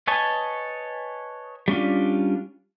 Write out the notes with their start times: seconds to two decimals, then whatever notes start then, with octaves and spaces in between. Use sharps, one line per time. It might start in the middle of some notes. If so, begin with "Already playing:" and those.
0.07 B4 C#5 D#5 G#5 A5
1.68 G3 C#4 D4 F4